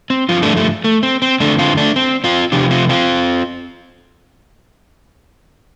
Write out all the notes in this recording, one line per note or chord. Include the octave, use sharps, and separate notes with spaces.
C4
G2 D3 F3 F4
A3 D4
A3
A3
C4
C4
F2 D3 F3 A3 D4
C4 F4
A3 D4
C4
C4 F4
F2 C3 F3 D4 G4
C4 F4
C4 F4